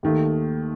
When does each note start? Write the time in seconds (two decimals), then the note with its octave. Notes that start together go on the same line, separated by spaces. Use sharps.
0.03 D#2 D#3 A3